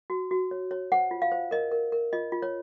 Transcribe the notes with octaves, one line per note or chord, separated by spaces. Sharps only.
F#4
F#4
C#5
C#5
C5 F#5
F4
F5
C5
A#4 D#5
A#4
A#4
F4 D#5
F4
C#5